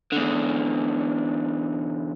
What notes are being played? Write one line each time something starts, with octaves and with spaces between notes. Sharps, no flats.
E2 D3